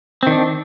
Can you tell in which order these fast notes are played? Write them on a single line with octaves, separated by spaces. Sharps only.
C4 D#3 D4